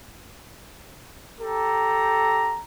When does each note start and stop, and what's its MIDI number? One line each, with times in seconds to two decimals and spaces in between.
1.41 2.60 67
1.41 2.60 69
1.41 2.60 82